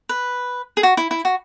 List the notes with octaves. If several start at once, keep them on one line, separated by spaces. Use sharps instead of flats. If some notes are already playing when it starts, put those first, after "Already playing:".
B4
G#4
F#4
E4
E4
F#4